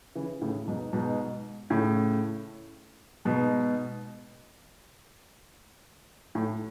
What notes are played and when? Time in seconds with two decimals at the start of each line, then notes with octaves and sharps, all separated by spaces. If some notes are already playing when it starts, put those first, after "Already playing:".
0.15 C#3 E3
0.41 A2 C#3
0.67 G#2 B2
0.93 G#2 B2
1.70 A2 C#3
3.25 G#2 B2
6.35 A2